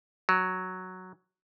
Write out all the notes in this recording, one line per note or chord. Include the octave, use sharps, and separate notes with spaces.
F#3